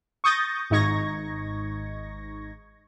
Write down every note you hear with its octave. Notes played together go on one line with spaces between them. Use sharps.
C#6 D#6 G6 A6 A#6
G#1 G#2 D#4 C#6 G#6 A#6